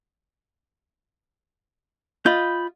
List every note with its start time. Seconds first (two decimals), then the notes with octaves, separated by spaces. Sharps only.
2.26 F4 D#5 B5 G6